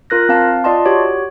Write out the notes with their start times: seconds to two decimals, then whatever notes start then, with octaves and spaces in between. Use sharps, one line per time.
0.10 F4 A#4 F#6 A#6
0.29 C4 F5 A5
0.64 F4 D5 D#5 A5 C6
0.86 F#4 G4 C#5